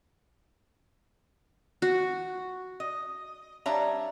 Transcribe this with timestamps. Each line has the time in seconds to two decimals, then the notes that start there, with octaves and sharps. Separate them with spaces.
1.82 F#4
2.80 D#5
3.66 G3 D4 C#5 E5 F5 A#5